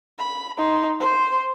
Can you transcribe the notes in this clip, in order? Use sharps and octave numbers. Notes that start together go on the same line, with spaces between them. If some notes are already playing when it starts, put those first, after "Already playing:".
B5
D#4 C6
C5 C6